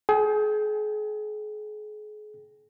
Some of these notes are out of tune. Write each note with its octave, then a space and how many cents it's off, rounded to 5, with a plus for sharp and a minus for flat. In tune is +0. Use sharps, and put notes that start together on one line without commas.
G#4 +35 G5 +0